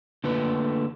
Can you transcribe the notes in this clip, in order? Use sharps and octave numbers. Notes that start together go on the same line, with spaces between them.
D3 A3 A#3 F4 B4